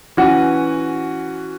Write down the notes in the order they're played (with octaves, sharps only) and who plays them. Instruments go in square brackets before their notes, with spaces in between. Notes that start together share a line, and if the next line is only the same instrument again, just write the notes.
[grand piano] E3 C#4 F#4 B4